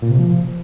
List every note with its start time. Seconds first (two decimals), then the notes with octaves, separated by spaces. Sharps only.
0.02 A#2
0.10 C3
0.18 F3